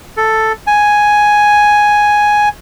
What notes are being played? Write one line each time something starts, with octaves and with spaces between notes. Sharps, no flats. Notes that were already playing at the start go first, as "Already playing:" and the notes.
A4
G#5